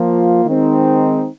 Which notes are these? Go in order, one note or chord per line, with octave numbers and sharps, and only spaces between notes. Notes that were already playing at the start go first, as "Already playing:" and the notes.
Already playing: F3 A#3 F4
D#3 G#3 C4 D#4